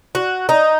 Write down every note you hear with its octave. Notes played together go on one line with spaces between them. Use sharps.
F#4
D#4